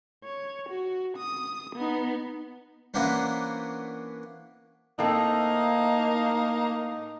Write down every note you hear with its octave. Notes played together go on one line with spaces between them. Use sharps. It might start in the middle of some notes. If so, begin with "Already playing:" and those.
C#5
F#4
D#6
B3 D#4
E3 A#3 B3 C#4 D4 C5
A2 A3 A#3 C4 D#4